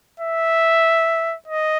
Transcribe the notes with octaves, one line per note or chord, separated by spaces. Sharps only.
E5
D#5